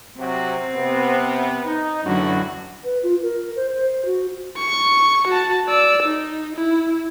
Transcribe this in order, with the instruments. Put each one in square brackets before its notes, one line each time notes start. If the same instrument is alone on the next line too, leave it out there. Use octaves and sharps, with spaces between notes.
[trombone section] C3 F#3 F#4 [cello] C4
[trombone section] C3 B3
D#4
[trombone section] A1 A2 F#4 [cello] F#2 D3
[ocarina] B4
F4
A#4
C5
C5
F#4
[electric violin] C#6
F#4 A5
D5 E6
D#4
E4